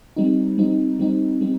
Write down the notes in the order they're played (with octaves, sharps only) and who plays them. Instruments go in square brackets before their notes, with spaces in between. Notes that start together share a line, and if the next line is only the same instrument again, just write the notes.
[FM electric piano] G3 C4 D#4
G3 C4 D#4
G3 C4 D#4
G3 C4